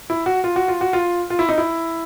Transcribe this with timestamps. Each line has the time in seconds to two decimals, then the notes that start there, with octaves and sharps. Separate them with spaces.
0.10 E4
0.26 F#4
0.44 F4
0.56 F#4
0.68 F4
0.81 F#4
0.93 F4
1.30 F4
1.39 E4
1.49 D#4
1.58 E4